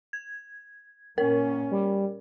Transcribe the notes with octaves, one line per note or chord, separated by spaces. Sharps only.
G#6
A#2 A#3 C#4 A#4
G3